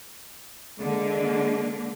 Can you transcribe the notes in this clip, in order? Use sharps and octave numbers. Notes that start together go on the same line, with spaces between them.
D3 G#3 A#3